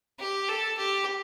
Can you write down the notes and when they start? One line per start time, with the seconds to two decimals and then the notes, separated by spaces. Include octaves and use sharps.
0.19 G4
0.49 A4
0.78 G4